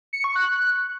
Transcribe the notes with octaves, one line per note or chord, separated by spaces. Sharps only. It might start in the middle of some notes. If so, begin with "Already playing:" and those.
C#7
C#6
F#6